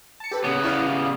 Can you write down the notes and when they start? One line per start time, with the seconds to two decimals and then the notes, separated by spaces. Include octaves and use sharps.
0.20 A5 C#7
0.31 G4 A4 B4
0.44 C#3 B3 C#5
0.64 E4 D5 F5